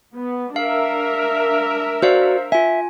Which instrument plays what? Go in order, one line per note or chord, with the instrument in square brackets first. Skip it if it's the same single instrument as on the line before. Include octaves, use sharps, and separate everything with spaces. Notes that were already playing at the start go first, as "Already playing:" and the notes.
[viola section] B3
[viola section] D4 A#4 E5 [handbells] F5
[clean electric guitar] F#4 D5 [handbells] C5 F5
[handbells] F4 G#5 [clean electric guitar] E5